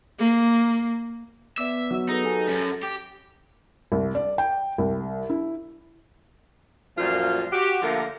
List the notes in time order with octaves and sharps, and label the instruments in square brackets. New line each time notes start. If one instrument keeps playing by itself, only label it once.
[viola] A#3
[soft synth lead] B3 [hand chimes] D5 D6 [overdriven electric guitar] E5
[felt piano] F#3 [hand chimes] E6
[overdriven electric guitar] D#4 [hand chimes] G#4 A4 B4
[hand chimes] G4 G#5 [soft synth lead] A4
[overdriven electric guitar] F#2 C#4 [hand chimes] A6 A#6
[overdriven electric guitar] G4
[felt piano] C2
D5
G5
C2
E4
[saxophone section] F#2 A#2 F3 G3 A3 F4
F#4 G4
D3 F3 A3 A#3